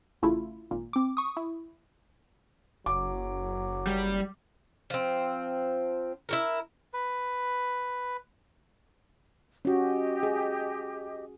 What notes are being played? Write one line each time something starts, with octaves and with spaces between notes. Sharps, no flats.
A1 C#3 A3 E4 F4
G#1 A#2
C4 D6
C#6 D#6
E4
F#1 F#3 D6
G3
F3 C4
E4 F#4 A#4
B4
C#4 F#4 G4 D#5
G#4